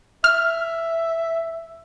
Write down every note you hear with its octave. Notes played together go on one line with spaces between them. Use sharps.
E5 F6